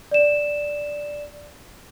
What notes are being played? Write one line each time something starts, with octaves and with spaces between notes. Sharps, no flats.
D5 E7